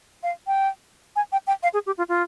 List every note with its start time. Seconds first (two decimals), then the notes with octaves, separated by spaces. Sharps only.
0.23 F5
0.47 G5
1.16 G#5
1.32 G5
1.47 G5
1.63 F5
1.74 G#4
1.86 G4
1.98 F4
2.09 F4